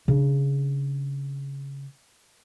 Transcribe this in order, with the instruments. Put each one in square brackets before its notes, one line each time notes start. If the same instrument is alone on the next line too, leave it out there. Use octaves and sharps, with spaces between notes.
[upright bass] C#3 D4